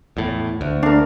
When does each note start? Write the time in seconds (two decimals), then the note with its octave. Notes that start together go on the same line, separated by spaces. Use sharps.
0.17 E2 A2
0.61 D2
0.83 D4 A#4